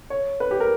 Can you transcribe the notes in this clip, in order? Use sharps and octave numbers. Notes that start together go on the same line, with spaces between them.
C#5
B4
G4
A#4